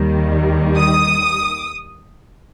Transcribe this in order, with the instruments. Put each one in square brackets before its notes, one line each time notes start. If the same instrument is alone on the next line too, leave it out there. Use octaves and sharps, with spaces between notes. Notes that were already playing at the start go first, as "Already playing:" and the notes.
Already playing: [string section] D#2 D#3 G3
D#6